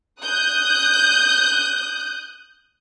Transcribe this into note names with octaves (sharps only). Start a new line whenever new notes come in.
D#6 F#6 G6